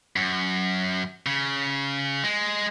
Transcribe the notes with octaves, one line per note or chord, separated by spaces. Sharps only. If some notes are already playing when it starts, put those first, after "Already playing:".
F#2
C#3
G#3